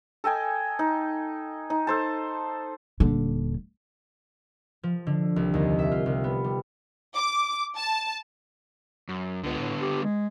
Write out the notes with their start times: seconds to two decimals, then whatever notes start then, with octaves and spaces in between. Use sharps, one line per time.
0.24 A4 D#5 G5 G#5
0.79 D#4
1.70 D#4
1.87 A4 C5 A5
3.00 D#1 D3
4.83 F3
5.07 D3
5.36 C2
5.54 D#2
5.79 E5
5.92 F4
6.06 C2
6.24 B3
6.44 G3
7.17 D6
7.77 A5
9.09 F#2
9.43 C#2 D3 B3
9.58 A2
9.81 G4
10.04 G#3